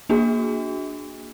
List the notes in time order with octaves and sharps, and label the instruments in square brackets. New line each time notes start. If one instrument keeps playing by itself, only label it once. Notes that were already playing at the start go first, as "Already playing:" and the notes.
[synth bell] A#3 D4 F#4 G#4